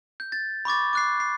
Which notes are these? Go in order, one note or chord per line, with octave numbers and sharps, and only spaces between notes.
G6
A6
B5 C#6 D6 A6
D6 F#6 C7
C7